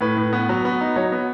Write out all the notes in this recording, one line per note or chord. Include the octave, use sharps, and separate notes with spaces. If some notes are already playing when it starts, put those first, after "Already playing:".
A2 B4
A2
B3
F#3
B3
D#4
F#3 C#5
B3